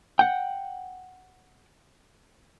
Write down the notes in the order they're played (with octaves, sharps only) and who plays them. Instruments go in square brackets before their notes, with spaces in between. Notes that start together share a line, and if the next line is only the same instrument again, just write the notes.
[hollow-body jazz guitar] F#5 G5